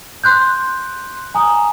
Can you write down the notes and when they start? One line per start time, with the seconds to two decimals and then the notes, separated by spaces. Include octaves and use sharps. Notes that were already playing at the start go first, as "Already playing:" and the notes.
0.24 C6 F#6 G6
1.35 G#5 A#5 D#6